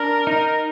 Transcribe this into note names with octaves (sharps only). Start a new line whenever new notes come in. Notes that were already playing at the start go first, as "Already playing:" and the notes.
Already playing: D4 A#4
D#4